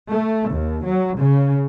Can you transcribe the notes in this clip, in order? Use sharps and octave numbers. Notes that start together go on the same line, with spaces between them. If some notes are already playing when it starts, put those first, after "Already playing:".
A3
D#2
F#3
C#3